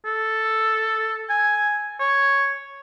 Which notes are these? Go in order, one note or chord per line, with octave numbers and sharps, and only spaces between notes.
A4
G#5
C#5